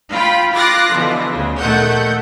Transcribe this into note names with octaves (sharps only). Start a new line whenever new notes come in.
F4 F5 G5 B5
F4 D6 F#6 A6 A#6 C7
B2 D3 E3 F3
D2 C#3
A#1 D#3 A3 F#5 G6